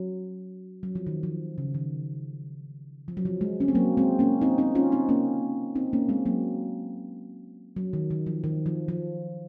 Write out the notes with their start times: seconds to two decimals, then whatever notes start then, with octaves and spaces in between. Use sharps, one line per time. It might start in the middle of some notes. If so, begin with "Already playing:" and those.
Already playing: F#3
0.83 F#3
0.95 F3
1.07 D#3
1.23 F3
1.58 C#3
1.74 D#3
3.08 F3
3.17 F#3
3.25 F3
3.41 G#3
3.60 C#4
3.68 C4
3.75 F#3 A#3
3.97 G#3 C4
4.19 A#3 C#4
4.41 C4 D#4
4.58 C4 D#4
4.75 C#4 F4
4.92 C4 D#4
5.09 A#3 C#4
5.75 C4 D#4
5.93 A#3 C#4
6.09 G#3 C4
6.26 F#3 A#3
7.76 F#3
7.93 D#3
8.11 D#3
8.26 F3
8.44 D#3
8.66 F3
8.88 F3